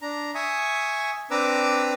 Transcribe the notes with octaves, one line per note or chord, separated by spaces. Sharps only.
D4 A#5
E5 G#5 C#6 D#6
C4 D4 B4 A#5 D6 E6